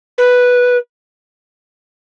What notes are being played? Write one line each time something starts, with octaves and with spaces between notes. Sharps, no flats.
B4